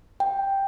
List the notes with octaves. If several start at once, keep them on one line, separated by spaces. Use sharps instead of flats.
G5